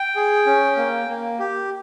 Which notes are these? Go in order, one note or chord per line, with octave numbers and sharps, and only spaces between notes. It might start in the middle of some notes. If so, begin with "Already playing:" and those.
Already playing: G5
G#4
C#4
A#3
A#3
G4